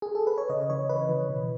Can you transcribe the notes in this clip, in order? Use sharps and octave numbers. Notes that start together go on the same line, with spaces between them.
G#4
A4
B4
C#5
C#3 D#5
E3 C#5
C#3 B4
E3
B2